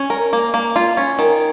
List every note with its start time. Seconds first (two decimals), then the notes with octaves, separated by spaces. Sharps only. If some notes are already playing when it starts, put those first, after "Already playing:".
Already playing: C#4
0.10 A#4
0.33 A#3
0.54 A#3
0.76 F4
0.97 C#4
1.19 D#3